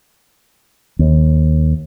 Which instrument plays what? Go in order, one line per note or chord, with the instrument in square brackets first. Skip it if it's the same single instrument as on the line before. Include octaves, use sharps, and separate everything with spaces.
[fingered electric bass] D#2